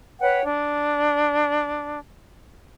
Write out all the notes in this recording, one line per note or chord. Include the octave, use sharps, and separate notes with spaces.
B4 C#5 F#5 G5
D4